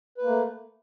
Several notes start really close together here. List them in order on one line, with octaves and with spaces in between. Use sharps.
B4 A#3 A3